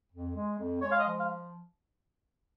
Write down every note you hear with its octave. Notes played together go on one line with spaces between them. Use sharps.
F2
G#3
F2
G#3 C#5
F5
D#5
F3
F5